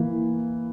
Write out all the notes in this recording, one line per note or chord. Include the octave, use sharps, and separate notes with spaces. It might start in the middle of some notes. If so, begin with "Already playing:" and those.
Already playing: E3 A#3